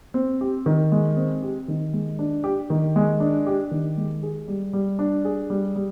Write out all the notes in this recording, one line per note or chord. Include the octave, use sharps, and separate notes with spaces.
C4
G4
D#3
G#3
C4
G4
D#3
G#3
D4
G4
D#3
G#3
D4
G4
D#3
G#3
G#4
G3
G3
D4
G#4
G3
G3